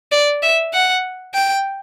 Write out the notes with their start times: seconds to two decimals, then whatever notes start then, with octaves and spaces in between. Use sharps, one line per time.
0.12 D5
0.43 E5
0.74 F#5
1.34 G5